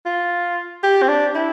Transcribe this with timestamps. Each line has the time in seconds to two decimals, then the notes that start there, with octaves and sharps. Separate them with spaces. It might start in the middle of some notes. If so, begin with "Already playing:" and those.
0.06 F4
0.84 G4
1.02 C4
1.09 D4
1.35 E4